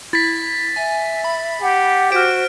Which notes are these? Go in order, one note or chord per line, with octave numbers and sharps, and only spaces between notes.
E4 A6 B6
E5 G#5
B5
G4 F#5
F#4 C5 F6 D7